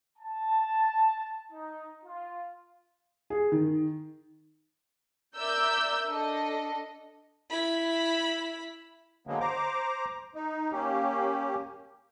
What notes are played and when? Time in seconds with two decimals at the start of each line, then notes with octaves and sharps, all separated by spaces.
0.18 A5
1.52 D#4
2.04 F4
3.30 G#4
3.52 D#3
5.37 A#4 D5 E5 E6 G6
6.09 D4 A4 D#5
7.50 E4 B5
9.27 D3 F#3 G#3 A#3 B3
9.40 C5 A#5 D6
10.35 D#4
10.72 A#3 C#4 G4